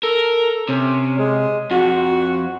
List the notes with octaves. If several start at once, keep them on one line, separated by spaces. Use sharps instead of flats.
A4 A#4
C3 C#4
G#3
F2 F#4